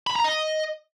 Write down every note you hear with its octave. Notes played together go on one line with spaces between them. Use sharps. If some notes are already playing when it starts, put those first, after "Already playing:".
B5
A#5
D#5